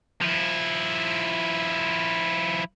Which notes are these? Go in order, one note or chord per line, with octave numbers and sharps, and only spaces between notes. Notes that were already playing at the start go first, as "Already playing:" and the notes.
F3 E4